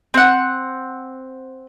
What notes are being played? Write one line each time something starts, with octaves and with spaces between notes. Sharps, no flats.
C4 F#5